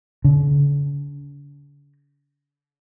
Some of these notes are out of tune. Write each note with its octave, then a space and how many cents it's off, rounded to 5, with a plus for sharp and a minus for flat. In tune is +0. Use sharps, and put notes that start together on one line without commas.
D3 -45